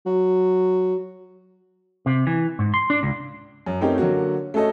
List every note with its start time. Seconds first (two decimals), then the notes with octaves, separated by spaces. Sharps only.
0.06 F#3
2.06 C3
2.27 E3
2.59 G#2
2.74 C6
2.90 D4
3.03 C#2
3.66 F#2
3.81 A3 C4 C#4 D#4 G4 A#4
3.98 D3 F#3 A#3 F#4
4.54 A3 C#4 F#4 A4 D#5